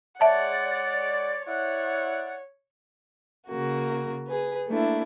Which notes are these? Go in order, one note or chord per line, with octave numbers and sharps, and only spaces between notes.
G#3 C#5 D5 E5 F#5 A5
E4 C#5 D5 F#5
C#3 A#3 F#4
G#4 B4
A3 A#3 D4 E4